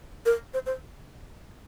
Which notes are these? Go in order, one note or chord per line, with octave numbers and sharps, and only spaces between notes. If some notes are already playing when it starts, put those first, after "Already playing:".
A#4
C5
C5